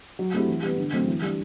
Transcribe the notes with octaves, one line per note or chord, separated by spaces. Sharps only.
F#3
A3 C4 E4 G4
E3
G3 B3
D3
F#3 A3 C4 F#4
E3
G3 D4